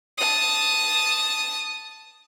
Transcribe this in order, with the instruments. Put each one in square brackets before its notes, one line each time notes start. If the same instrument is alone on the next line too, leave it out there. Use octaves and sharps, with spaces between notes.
[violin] A5 D#6